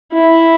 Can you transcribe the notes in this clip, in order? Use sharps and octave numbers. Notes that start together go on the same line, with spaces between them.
E4